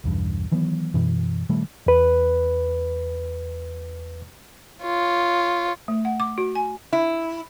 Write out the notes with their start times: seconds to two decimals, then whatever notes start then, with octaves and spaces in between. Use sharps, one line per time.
0.04 B1 E2 G2
0.52 D#3 E3 F#3 B3
0.94 F#2 B2 E3
1.49 A#2 D#3 G3 A3
1.86 E2 B4
4.83 F4 C#5
5.88 A3
6.05 F#5
6.20 D6
6.38 F#4
6.55 G#5
6.93 E4